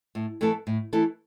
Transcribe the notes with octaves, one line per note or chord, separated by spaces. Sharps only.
A2
E3 A3 E4 A4
A2
E3 A3 E4 A4